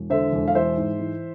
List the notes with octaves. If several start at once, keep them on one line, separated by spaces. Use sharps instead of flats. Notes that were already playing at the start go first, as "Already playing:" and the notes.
Already playing: E1
D3 C5 E5
E1
F5
E3 C5 E5
G#2
E3